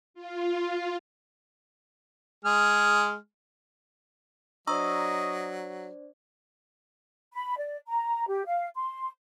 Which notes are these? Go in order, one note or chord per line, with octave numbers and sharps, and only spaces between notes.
F4
G#3 G#4 F6
F#3 D4 C5 D5 D#5 A#5 C#6 E6
B5
D5
A#5
G4
F5
C6